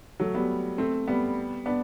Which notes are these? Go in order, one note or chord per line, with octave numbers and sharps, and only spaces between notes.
F#3 A3
G3 B3
A3 C4
G3 B3
B3 D4